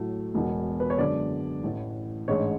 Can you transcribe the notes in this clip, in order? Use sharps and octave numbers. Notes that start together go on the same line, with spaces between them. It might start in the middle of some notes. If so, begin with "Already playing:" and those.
Already playing: A2 F#3 A3
E1 E2 B2
B4
C#5
F#2 D3 G#3 B3 D4 D5
A1 A2 E3
A1 G#2 G#3 D4 C#5